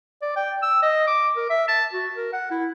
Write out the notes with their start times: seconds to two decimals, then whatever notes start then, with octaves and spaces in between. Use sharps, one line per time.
0.22 D5
0.36 G5
0.63 E6
0.82 D#5
1.07 D6
1.37 A#4
1.50 E5
1.68 A5
1.93 F#4
2.16 A#4
2.33 F#5
2.51 E4